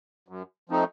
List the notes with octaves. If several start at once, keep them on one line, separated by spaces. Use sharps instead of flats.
F#2
F3 A3 C4 D#4